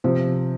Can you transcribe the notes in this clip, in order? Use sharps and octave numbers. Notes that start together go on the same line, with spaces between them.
C3 F3 C4